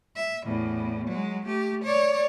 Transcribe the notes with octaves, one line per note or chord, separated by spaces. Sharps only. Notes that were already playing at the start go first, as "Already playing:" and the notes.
E5
E2 A2
F#3 G#3
A3 G4
C#5 D5